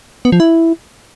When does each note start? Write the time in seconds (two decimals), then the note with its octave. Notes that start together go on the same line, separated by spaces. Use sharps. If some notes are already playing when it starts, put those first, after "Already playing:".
0.25 B3
0.32 F3
0.40 E4